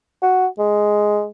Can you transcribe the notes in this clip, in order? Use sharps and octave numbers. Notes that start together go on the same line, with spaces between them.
F#4
G#3